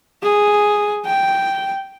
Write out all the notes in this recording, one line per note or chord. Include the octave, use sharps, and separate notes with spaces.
G#4
G5